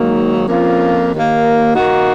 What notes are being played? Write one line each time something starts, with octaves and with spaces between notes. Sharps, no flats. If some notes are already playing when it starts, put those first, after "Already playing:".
Already playing: G#2 D#3 F#3 A#3
F2 F3 A#3 C#4 F4
D#2 D#3 A#3
D#3 A#3 D#4 F#4